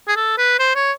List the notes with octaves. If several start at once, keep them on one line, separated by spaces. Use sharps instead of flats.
G#4
A4
B4
C5
C#5